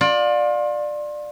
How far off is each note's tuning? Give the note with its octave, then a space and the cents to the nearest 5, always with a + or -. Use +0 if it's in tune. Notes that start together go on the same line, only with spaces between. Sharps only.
F4 +30 D5 +15